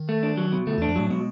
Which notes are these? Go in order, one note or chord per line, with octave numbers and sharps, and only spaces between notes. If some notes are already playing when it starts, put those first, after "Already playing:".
Already playing: D#3
A3
D4
F#3
B2
D3 A3
E2 E3 D4
F2 F3
A2 F#3 A3
B2 G#3